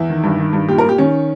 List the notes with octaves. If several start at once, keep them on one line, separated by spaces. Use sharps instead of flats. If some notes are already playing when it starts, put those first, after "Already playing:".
Already playing: E2 E4
D#3
G2
D#3
G2
A#2 G4
A#4
A#2 G4
D#3 C#4